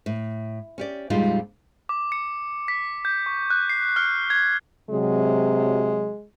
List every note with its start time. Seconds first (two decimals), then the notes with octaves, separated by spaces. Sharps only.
0.06 A2
0.78 C#4 G4 D5
1.10 F2 A#2 G3 G#3 D#4 F4
1.89 D6
2.12 C#7
2.68 B6
3.05 G6
3.26 C#6
3.50 F#6
3.69 C7
3.96 F6
4.30 G#6
4.90 C3 F#3 G#3